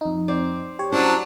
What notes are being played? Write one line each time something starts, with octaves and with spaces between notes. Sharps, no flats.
F2 D#4
C4 D5
G4 C#5
F#3 C#4 D4 E4 C5